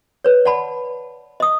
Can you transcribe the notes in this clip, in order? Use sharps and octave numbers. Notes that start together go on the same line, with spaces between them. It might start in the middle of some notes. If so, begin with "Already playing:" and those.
B4 C#5
D5 F#5 A5 B5
D#5 D#6